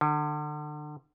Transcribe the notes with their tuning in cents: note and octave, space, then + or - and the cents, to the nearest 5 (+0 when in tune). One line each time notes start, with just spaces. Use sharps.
D3 +35